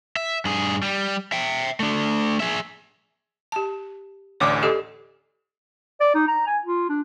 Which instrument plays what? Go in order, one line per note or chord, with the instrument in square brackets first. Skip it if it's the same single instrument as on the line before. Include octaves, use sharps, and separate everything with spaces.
[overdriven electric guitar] E5
G2 G#4
G3
E5 G5
A3 D4
G#4 E5
[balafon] G4 A5
[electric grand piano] A1 D2 D6 [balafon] C#5 D5
[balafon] G4 A4 D#5
[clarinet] D5
D#4
A#5
G#5
F4
D4